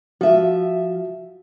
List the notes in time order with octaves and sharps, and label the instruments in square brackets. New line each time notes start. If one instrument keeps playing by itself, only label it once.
[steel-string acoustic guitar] F3 E5 [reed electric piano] F#4